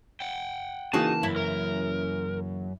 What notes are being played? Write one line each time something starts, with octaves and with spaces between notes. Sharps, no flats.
F#5 G5
C#3 E3 A#3 D#4 F#4 G#4 A5
F#2 E4
A#4